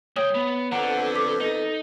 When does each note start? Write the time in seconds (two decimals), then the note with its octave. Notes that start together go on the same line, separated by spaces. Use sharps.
0.16 G#3 C#5 G5 D#6 F#7
0.35 B3
0.72 F2 D3 B3 F#5 A#5
1.15 A4 D6 B6
1.41 D#4